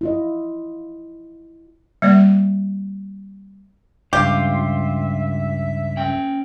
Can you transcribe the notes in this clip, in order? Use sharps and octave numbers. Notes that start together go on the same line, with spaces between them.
E4 F4 D#5
G3 A#3 D5
C#2 G2 F4 G4 E5
C#4 G5